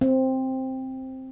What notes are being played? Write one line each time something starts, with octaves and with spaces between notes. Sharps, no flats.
C4